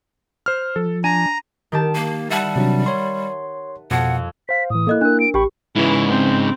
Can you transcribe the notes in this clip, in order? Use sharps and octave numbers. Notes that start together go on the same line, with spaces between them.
C5 F6
F3 A4
D4 G#5 A#5 D#7
D#3 G4 A5
A#3
G3 E5 F#5 A5
C3 F#3 D4
C#5 C6
F2 B2 F#5
C5 F5 B6
A2 E3 D#6
A#3 E4 A4 D#5 F#6
D4 A#4 F#6
D7
A1 G4 G5 B5 C#6
G#2 C#3 E3 E4
C4